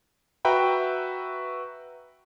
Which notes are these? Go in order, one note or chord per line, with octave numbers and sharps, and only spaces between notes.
F#4 B4 E5 G5 A#5 B5